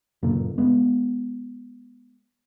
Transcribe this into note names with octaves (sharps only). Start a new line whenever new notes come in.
F#2 A#2 C#3 A#3
G#3 B3